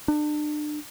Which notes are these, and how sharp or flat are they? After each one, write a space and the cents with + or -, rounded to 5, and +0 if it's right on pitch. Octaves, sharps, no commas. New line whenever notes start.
D4 +35